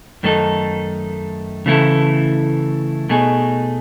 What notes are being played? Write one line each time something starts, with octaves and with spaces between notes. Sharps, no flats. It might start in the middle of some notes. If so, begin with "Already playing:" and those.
F#2 D#3 A3 D#4 A4
C#3 E3 A3 E4 A4
B2 A3 D#4 G#4